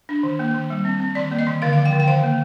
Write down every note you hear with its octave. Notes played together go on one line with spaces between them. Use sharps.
D4
D#3
A#3
D#3
G3
C4
C4
D#3 D5
A#3
D#5
D#3
D3 F5
F3 F5
G5
D3
G5
D#3 F5
A#3